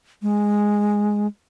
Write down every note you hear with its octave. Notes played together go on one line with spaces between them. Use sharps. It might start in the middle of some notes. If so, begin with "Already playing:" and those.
G#3